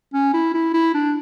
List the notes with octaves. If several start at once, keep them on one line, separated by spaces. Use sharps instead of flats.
C#4
E4
E4
E4
D4